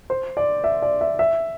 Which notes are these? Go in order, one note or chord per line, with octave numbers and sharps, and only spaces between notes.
C5
D5
E5
D5
E5
E5